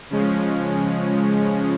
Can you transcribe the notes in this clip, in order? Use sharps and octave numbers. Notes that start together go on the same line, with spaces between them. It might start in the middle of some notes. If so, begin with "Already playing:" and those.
C#3 F3 G#3 C#4